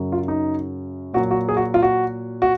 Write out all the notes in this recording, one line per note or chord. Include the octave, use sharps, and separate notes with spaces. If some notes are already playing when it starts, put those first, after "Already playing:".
Already playing: F#2 C#3 F#3
F4
D#4
A#2 F#3 F#4
F#4
G#4
F#4
F4
F#4
F#4